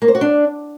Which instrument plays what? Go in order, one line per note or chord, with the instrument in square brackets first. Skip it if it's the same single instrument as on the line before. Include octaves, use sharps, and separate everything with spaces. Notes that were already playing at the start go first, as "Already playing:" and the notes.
[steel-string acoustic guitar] A#3
C5
F#4
D4